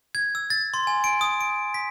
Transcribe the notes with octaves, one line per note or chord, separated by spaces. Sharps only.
G#6
E6
A6
C6
G#5
D7
D#6
D7
B6